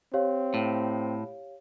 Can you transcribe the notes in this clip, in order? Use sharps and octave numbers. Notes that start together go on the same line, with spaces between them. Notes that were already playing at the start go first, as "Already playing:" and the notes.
C4 G4 C#5 F5
A2